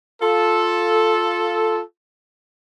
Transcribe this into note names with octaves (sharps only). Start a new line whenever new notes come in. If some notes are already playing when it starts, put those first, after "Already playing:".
F4 A4